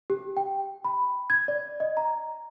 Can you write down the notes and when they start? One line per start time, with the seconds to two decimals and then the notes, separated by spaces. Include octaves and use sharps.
0.10 G4
0.37 G5
0.85 B5
1.30 G#6
1.48 D5
1.80 D#5
1.97 A#5